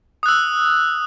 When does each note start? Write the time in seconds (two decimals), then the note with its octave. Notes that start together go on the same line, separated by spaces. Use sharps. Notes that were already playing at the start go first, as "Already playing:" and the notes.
0.23 D#6
0.26 F#6
0.28 E6